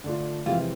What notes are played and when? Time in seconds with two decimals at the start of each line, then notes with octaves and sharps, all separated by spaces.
0.04 D3 A3 D4 F4
0.46 F2 C3 E3 G#3 C4 F4